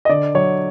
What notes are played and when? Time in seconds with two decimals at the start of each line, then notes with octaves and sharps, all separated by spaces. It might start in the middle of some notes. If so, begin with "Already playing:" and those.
0.05 D#5
0.09 D3 D5
0.35 F#3 C#5